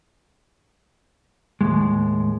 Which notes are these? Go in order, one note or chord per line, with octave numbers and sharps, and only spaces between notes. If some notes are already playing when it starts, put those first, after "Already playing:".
D#2 A2 G#3